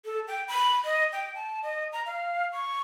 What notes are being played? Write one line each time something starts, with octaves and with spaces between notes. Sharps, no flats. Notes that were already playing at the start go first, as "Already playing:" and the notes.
A4
G5
B5
D#5
G5
A5
D#5
A#5
F5
C#6